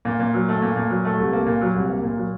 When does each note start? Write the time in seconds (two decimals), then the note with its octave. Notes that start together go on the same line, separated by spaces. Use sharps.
0.05 A#2
0.20 A#2
0.34 F#3
0.48 A3
0.62 A#2
0.76 A#2
0.90 F#3
1.05 A3
1.18 C2
1.33 A#3
1.46 A#2
1.61 F#3
1.74 C2
1.88 A#3
2.04 A#2
2.17 F#3